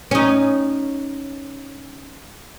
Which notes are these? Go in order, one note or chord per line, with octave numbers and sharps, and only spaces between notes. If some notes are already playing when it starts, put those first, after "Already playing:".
C#4 D#4